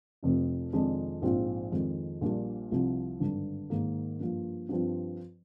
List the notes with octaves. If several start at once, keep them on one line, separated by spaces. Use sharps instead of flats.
F1 F2 C3
F2 C3 D#3 G#3 D4
A#1 G#2 F3 C4 F4
F2 D#3 G#3
A#1 A#2 G3 D4
C2 C3 F3
G#1 G2 D3 G3 D4
G#2 D#3 A#3
G2 F3 A#3 F4
G2 F3 C4 F4